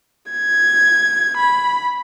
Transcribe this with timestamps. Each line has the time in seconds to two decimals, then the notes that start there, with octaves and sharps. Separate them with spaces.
0.32 G#6
1.37 B5